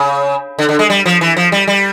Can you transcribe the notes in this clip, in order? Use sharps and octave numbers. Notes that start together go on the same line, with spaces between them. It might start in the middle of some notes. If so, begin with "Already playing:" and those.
Already playing: C#3
D3
D3
G#3
G3
F3
E3
F3
G3
G3